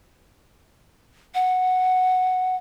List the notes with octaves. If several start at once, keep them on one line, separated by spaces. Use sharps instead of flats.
F#5